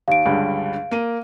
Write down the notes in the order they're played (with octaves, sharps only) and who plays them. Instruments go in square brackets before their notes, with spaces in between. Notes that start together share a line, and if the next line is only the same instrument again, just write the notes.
[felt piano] D#2 [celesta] F5 D7
[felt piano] C#2 G2 D3
A#3 D#7